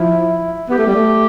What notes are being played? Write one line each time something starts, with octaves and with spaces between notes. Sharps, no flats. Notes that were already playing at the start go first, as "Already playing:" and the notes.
Already playing: F3 E4
B3 G4
A3
G3
A3